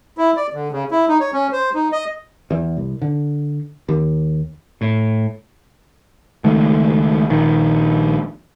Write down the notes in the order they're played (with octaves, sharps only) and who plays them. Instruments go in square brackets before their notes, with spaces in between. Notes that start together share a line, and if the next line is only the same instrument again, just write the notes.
[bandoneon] E4
D5
D3
C#3
E4
D#4
C#5
C#4
C5
D#4
D#5
[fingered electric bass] E2
C2
D3
D#2
[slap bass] A2
[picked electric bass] C#2 D#3 A3
A#1 D#3